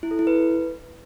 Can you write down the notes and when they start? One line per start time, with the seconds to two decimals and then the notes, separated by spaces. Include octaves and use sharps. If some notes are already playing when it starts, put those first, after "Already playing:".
0.03 E4
0.11 A4
0.19 E4
0.27 B4